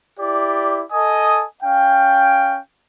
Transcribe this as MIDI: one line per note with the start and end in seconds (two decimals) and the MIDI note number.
0.19 0.83 64
0.19 0.83 67
0.19 0.83 74
0.92 1.46 69
0.92 1.46 75
0.92 1.46 80
0.92 1.46 87
1.63 2.60 61
1.63 2.60 77
1.63 2.60 79